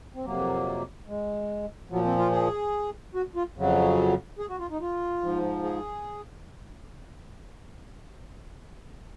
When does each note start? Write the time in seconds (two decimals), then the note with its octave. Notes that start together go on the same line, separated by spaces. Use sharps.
0.15 C4
0.25 F2 C3 F#3 A#3
1.08 G#3
1.90 A#2 F3 F#3
2.05 C4
2.18 F4
2.32 G#4
3.15 F#4
3.36 F4
3.56 F2 C#3 F#3
4.39 G#4
4.49 F#4
4.59 F4
4.70 D#4
4.81 F4
5.21 G#2 F3
5.63 G#4